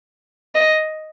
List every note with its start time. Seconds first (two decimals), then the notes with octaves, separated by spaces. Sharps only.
0.55 D#5